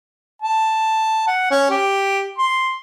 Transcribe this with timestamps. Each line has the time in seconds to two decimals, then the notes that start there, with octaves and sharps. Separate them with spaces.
0.42 A5
1.27 F#5
1.51 C#4
1.71 G4
2.38 C6